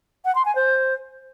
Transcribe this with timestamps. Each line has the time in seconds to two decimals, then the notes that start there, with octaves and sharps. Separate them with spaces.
0.25 F#5
0.35 C6
0.45 G#5
0.55 C5